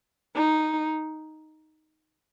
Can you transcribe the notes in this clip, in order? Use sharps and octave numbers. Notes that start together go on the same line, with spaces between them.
D#4